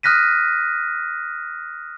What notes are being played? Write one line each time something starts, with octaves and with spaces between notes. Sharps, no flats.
D#6 F6 F#6 A#6 B6 D#7